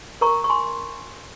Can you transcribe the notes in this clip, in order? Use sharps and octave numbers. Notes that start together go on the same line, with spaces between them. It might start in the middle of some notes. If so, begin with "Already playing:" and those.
A#4 A#5 C#6
C#6
G#5 C6